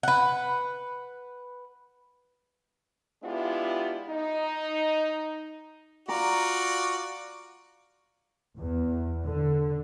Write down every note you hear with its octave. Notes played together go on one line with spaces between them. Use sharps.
B4 F#5
G#3 B3 D4 E4 F4 G4
D#4
F4 F#4 D5 A#5
E2
D3